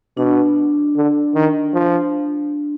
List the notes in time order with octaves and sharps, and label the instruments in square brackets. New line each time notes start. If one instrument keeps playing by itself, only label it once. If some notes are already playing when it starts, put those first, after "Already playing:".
[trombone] B2 [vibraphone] D4
[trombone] D3
D#3
F3